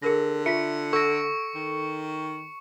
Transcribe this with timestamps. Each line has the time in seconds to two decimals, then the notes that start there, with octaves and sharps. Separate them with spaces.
0.02 D3 G#4 A#4 A#6
0.46 F4 E5 B6 C#7
0.93 A4 C#6 E6 A#6 D7
1.55 D#3